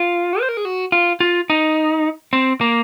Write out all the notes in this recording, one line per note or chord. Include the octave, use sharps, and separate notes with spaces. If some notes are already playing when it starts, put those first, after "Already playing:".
Already playing: F4
C5
A#4
G#4
F#4
F4
F4
D#4
C4
A#3